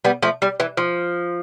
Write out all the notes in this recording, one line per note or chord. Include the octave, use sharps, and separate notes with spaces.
G3 B3
F3 A3
G3
E3
F3